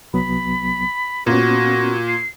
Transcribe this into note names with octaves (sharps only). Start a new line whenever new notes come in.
C2 F#3 B3 B5
A#2 B3 C#4 F#4 A#6
C7